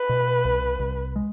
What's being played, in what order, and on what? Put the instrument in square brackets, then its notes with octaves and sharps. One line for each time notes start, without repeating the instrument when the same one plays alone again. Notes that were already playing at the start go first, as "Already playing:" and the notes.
Already playing: [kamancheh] B4
[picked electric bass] B2
C2
C2
G#3